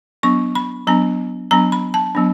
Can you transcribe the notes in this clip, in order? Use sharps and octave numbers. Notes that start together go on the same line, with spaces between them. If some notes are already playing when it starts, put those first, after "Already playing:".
F#3 B3 D4 C#6
B5
F#3 B3 D4 A#5
F#3 B3 D4 A#5
B5
A5
F#3 B3 D4